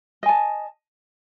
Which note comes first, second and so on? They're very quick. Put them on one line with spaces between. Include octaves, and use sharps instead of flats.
D#5 G#5 A5